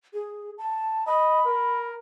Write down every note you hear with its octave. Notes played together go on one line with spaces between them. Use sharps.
G#4
A5
D#5 B5
A#4